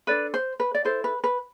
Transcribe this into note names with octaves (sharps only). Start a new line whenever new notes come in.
D4 A4 B4 D5
C5
B4
D5
E4 A4 C5
B4
B4